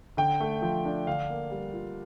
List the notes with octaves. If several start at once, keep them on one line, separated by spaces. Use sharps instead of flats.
D3 G5
A3
F3
D4
D3 F5
A#3
G3
F4